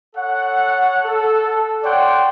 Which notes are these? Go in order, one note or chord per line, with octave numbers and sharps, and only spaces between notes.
A4 C#5 F#5
A4
C#5 D5 F#5 G5 C6